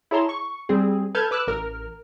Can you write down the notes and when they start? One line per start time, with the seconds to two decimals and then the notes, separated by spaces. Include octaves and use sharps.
0.11 E4 G#4 C#5 A5 A#5 C6
0.29 C#6
0.69 G3 C4 G#4
1.15 A4 B4 A5 F6 G6 G#6
1.31 B4 D6 E6 F#6
1.47 A1 A#4 F6